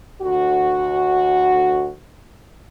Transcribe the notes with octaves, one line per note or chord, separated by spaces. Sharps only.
D2 F#4